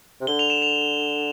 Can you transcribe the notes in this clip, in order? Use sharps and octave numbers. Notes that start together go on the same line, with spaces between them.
C3
D3 G7
F7
E7
F7